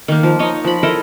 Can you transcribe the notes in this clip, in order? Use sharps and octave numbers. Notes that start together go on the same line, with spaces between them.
D#3 A#3
F3
D#4 C#5 D#5
F3 B5
E4 A4 A#4 D#5